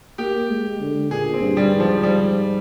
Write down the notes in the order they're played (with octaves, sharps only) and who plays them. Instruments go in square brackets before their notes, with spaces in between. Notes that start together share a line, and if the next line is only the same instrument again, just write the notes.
[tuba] A#3 [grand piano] G4
[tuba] G#3
D3
[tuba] A#2 [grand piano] G#4
[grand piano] C4
[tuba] G2
[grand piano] G3
[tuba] G#2
[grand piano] F3
G3